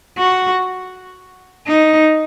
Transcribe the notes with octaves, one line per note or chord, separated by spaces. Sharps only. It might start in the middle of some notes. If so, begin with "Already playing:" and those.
F#4
D#4